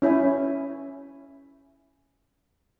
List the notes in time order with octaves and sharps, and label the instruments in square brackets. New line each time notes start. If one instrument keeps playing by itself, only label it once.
[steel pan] C#4 E4 C#5 G#5